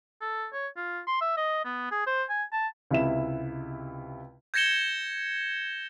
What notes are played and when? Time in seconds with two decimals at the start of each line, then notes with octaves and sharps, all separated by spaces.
0.21 A4
0.53 C#5
0.77 F4
1.07 C6
1.21 E5
1.37 D#5
1.65 B3
1.91 G#4
2.06 C5
2.30 G#5
2.52 A5
2.91 C#2 C3 E4 E5 E7
4.54 G6 G#6 A#6 C#7 E7 G7